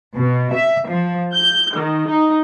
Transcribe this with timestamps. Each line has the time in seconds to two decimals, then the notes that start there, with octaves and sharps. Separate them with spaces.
0.14 B2
0.52 E5
0.87 F3
1.34 G6
1.76 D#3
2.09 D#4